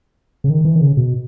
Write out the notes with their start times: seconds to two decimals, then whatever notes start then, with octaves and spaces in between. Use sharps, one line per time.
0.44 C#3
0.50 D#3
0.65 E3
0.76 D#3
0.81 C#3
0.97 B2